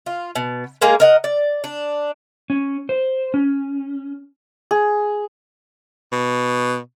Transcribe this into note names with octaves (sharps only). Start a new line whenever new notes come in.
F4
B2
G#3 A#3 G#4 A#5
A#4 D#5 F#5
D5
D4
C#4
C5
C#4
G#4
B2